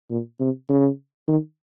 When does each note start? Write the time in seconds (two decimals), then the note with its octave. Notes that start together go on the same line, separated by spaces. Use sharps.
0.11 A#2
0.40 C3
0.69 C#3
1.28 D#3